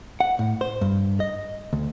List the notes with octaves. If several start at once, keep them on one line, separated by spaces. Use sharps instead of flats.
F#5
A2
C5
G2
D#5
D2